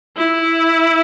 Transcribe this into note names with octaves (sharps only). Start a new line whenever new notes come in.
E4